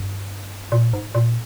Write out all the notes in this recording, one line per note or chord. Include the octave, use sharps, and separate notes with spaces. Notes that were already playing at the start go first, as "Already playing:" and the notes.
Already playing: G2
A#2
G#2
A#2